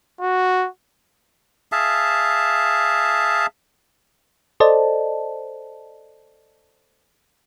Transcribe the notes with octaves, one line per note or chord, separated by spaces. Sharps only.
F#4
G#4 E5 F5 A5
A4 C5 D5 D#5 A5